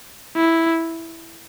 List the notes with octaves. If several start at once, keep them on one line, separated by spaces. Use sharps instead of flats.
E4